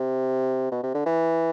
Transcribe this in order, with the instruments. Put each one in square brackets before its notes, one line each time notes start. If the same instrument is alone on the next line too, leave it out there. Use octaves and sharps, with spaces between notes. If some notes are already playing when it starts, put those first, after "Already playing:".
Already playing: [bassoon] C3
B2
C3
D3
E3